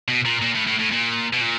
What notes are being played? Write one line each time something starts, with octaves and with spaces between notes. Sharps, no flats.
B2
A#2
A#2
A2
A2
A2
A#2
B2
A#2